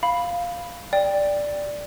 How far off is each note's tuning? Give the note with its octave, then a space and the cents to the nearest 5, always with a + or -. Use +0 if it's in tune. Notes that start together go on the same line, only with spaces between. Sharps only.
F5 +0 B5 +0
D5 +0 G5 +15